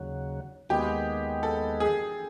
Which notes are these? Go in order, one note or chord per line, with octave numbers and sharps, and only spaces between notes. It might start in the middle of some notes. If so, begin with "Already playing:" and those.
Already playing: D#2 C#3 F#3
D#2 D#3 G#3 B3 G4
A4
G#4